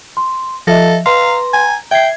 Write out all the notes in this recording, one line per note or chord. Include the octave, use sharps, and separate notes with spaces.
C6
F3 A4 D#5 E5 A#6
B4 F5 A#5 C6
G#5
E5 G5 G#6 C7